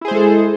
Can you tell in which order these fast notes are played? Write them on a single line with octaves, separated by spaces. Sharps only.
E4 G#4 C5 G#3 A4